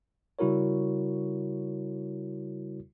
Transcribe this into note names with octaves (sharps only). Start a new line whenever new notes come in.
C#3 G3 E4 F#4 A#4 C#5